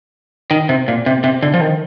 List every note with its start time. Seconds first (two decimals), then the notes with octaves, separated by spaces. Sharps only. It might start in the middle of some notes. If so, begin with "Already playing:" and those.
0.51 D#3
0.69 C3
0.88 A#2
1.06 C3
1.24 C3
1.42 D3
1.54 F3
1.61 D#3